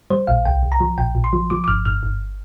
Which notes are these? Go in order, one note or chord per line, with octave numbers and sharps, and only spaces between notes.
G3 C5
A#1 F5
C2 G5
C2
A#5
F3
A#1 G5
A#1
C6
F3
F3 D6
D6
G1 F6
G1 F6
G1